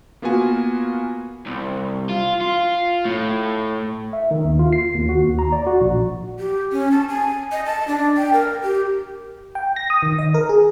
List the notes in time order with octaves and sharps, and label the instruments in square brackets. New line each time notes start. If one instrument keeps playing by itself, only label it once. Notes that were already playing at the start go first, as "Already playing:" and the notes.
[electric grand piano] A#3 B3 F4 F#4 G#5
[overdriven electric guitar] C2
F4
F4
A2
[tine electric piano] E5
D#3
D#2
F4
C7
D#2
F#4
D#2
A#5
D5
F#4
A#1
[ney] G4
C#4
A5
G#5
D#5
A5
D4
G5
A#4
G4
[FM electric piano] G5
A#6
D#6
D#3
D#5
A#4
G#4